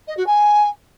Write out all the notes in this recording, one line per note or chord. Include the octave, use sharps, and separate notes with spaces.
D#5
F#4
G#5